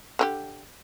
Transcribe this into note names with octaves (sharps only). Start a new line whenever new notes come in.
D3 D4 G4